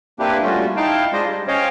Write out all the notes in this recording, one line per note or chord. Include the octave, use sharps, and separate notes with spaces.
A#3 C4 D4 E4 G4 B4
G3 A3 C#4 F4 F#4
D#4 E4 F5 G5 A5
G#3 D4 F4 C5 D#5
G3
C#4 C5 C#5 D#5 F5 G5